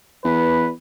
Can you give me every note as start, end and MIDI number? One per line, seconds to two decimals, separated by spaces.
0.24 0.71 40
0.24 0.69 71